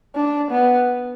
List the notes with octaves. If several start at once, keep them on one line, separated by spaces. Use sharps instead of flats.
D4
B3